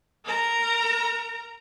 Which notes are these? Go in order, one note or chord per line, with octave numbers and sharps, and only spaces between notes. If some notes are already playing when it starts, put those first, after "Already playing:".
A#4 A#5